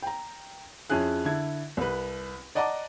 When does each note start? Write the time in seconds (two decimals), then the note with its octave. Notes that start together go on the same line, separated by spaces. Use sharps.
0.02 G5 A#5
0.90 F2 C#4 E4 G#4 F#6
1.25 D3 E4 G#6
1.77 C2 B4
2.55 D5 D#5 F#5 A5 A#5 D6